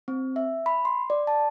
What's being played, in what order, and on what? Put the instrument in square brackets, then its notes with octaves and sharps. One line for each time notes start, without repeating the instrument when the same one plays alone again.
[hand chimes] C4
E5
B5
C6
D5
A5